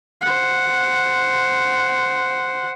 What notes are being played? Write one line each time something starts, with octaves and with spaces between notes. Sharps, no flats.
C5 F#5